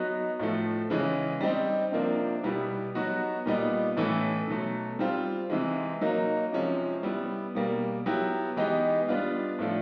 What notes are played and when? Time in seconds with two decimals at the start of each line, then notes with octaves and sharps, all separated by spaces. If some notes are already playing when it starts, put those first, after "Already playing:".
Already playing: F#3 B3 D#4 F#4
0.39 A2 F3 A3
0.90 C#3 E3 G#3 C#4
1.41 G3 C4 D#4 G4
1.92 C3 F3 A#3 D4
2.43 B2 G3 B3 E4 G4
2.95 F#3 B3 D#4 F#4
3.46 A#2 G3 B3 D#4
3.97 A2 E3 A3 C#4 E4
4.48 B2 F#3 A3
4.99 G3 C4 F4
5.50 C3 E3 G#3
6.01 F#3 A#3 D#4
6.52 C3 F3 G#3 C#4
7.03 G3 B3 E4
7.55 B2 G3 A#3
8.06 F#3 B3 E4 G4
8.56 E3 G#3 B3 D#4 G4
9.08 G3 B3 D4 F4
9.59 A2 F3 A3 D4 F4